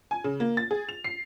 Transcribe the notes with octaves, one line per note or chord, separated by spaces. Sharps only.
G#5
C#3
A#3
A6
G#4
F7
C7